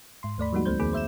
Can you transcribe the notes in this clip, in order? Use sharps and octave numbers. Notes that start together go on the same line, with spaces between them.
G#2 C6
D#2 A3 D5 B5
F3 G3 G#3 A#3 D#4 F#4
C#2 A3 C4 C5 G6
E2 D#3 A#3 G#4 B5 D6
C5 E5 G6 E7